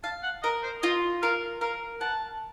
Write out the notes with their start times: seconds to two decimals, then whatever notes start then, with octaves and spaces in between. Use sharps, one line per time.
0.04 F5 A5
0.23 F#5
0.43 A#4 D#5
0.63 C5
0.82 F4 D#5
1.22 A#4 F5
1.61 A#4 F5
2.01 F#5 A5